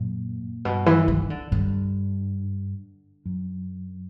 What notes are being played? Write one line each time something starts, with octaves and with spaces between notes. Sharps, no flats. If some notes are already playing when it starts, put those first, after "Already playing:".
Already playing: F#2 A#2
G2 B2
E3
D#3
D3
G2 D3
F#2